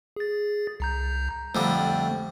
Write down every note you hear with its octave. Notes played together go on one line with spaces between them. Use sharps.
G#4 A6
C2 A#5 G6
F2 D3 G3 A3